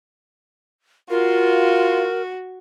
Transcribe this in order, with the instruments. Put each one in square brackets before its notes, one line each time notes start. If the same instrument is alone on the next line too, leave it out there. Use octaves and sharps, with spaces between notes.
[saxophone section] F4 [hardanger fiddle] F#4 [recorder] A#4